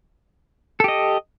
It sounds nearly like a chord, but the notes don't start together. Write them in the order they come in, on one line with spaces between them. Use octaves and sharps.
A4 G4 D#5